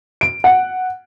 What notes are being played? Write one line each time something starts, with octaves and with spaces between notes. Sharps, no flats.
D7
F#5